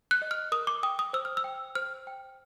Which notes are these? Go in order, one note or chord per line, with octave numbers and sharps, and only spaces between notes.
F#6
D#5
F6
A#4 D#6
D6
G5 D#6
D#6
C5 E6
F6
E6
G5
C5 F6
G5